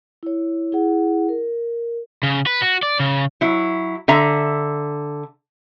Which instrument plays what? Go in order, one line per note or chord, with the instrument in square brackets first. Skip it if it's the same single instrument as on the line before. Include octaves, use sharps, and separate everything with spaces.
[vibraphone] E4 C#5
E4 G#4 F#5
A#4
[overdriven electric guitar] C#3
B4
F#4
D5
C#3
[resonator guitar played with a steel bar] F#3 E4
D3 E5 A#5